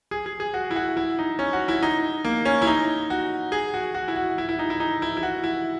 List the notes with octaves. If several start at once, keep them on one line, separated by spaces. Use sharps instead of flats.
G#4
G#4
G#4
F#4
E4
F#4
E4
D#4
C#4
F#4
E4
D#4
A#3
C#4
E4
D#4
F#4
G#4
F#4
F#4
E4
F#4
E4
E4
D#4
E4
D#4
E4
E4
F#4
E4